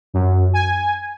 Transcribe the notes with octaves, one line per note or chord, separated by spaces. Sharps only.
F#2
G#5